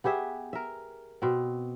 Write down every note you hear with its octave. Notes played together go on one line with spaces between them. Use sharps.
B3 G4 G#4 E5
A#4 E5
B2 C4